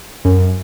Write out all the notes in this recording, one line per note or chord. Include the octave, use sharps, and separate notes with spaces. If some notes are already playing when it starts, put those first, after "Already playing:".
F#2